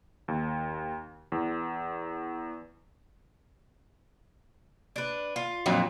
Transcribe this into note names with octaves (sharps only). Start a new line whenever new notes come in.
D#2
E2
D4 B4
F4
F2 A#2 F#3